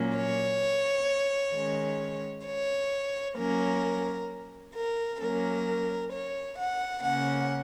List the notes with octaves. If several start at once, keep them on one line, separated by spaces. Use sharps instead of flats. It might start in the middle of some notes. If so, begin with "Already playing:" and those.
Already playing: A#2 F#3 A#3 C#4
C#5
D#3 G#3 C#4
C#5
F#3 A#3 C#4 A#4
A#4
F#3 A#3 C#4 A#4
C#5
F#5
C#3 A#3 C#4 F#5